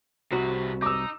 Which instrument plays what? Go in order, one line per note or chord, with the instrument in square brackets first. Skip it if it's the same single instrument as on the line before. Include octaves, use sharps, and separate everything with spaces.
[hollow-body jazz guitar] C2 F#4 [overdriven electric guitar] C3 B4
[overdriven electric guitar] D#4 [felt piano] D6 E6